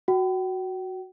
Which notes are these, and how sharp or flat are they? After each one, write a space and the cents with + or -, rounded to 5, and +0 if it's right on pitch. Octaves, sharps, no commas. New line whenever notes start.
F#4 +0 G5 -40